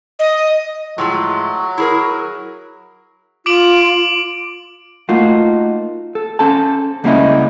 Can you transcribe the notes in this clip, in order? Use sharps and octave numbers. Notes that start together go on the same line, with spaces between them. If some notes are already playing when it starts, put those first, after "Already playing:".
D#5
A2 F3 F#3 G#3
E4 G#4 A#4
F4 D6 D7 F#7
A3 A#3 D#4 F4 F#4
A4
C#4 A4 C5 A5
C#2 G3 A#3 C#4 E4 D#5